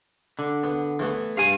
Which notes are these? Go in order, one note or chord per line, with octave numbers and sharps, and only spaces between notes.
D3
B3
E3 A3 B3
G2 F5 G#5